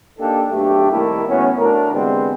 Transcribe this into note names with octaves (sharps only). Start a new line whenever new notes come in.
A#3 D4 D#4 G4 A4
B1 G2 A3 D4 G4
C2 D#3 A3 A#3 E4 A#4
A2 E3 F#3 B3 C#4
A2 D4 F#4 A#4
D3 E3 G3 G#3 B3 C4